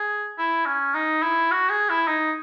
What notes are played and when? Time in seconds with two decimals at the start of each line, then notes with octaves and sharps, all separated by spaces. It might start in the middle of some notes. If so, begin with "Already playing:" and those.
Already playing: G#4
0.39 E4
0.66 C#4
0.95 D#4
1.23 E4
1.51 F#4
1.70 G#4
1.89 E4
2.08 D#4